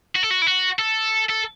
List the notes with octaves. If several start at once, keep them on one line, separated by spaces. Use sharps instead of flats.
F#4
A4
F#4
E4
F#4
A4
A4